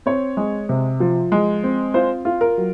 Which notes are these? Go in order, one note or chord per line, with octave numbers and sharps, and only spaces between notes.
C4 C#5
G#3
C3
F3
G#3
C4
F4 C5
F4
A#4
F#3